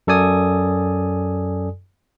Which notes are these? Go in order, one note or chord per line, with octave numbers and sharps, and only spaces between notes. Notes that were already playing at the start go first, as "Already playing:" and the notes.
F#2 A4 D5 G#5 D#6